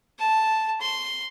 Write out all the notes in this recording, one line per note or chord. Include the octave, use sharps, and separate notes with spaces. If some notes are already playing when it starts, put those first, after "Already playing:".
A5
C6